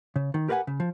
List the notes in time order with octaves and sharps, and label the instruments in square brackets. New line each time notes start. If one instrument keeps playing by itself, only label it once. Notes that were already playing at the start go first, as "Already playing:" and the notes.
[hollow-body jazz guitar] C#3
D#3
G4 A#4 B4 D5 F#5 G#5
C#3
F3